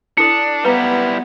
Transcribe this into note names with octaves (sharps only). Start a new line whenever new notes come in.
D4 E4 A4 C#7
G3 B3 E4 B4 F5 A#5